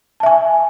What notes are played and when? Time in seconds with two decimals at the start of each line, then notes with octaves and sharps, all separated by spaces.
0.20 A5
0.23 E5
0.26 G#5